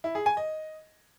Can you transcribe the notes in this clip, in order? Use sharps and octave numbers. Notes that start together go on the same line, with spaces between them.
E4
G#4
G#5
D#5